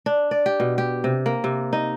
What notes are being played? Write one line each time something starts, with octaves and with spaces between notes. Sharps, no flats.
D4
D5
G4
B2
G4
C3
A#3
C3
D#4